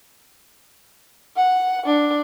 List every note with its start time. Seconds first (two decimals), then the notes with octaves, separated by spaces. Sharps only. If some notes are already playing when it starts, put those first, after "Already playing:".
1.37 F#5
1.86 D4